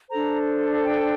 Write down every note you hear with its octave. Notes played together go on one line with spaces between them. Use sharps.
D4 A4 C5 A#5
G5